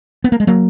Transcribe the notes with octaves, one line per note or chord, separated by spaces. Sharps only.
B3
A#3
G#3
F#3 A#3